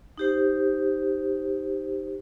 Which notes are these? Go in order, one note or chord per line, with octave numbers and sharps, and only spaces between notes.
D#4 G4 C5